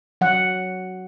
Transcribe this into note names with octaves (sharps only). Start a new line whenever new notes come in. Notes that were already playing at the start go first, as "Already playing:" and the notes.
F#3 F#5